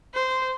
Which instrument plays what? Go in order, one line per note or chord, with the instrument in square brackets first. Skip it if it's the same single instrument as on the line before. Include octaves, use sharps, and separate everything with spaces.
[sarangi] C5